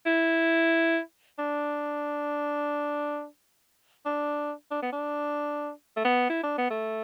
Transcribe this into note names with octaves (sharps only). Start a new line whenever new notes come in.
E4
D4
D4
D4
B3
D4
A3
B3
E4
D4
B3
A3